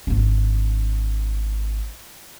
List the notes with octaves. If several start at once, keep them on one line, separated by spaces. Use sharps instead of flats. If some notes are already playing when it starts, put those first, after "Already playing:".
G#1 D4